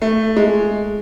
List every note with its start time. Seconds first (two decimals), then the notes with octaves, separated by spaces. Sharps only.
0.02 A3
0.36 G#3